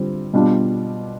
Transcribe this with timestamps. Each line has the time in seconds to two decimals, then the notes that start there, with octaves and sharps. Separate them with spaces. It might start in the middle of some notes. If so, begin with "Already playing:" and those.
Already playing: D3 G3 C4 F4
0.33 B2 G3 D4 F4